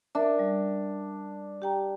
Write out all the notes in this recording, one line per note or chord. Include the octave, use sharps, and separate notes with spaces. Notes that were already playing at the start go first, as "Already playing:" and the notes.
D4 A#4 E5
G3
G4 G5 A#5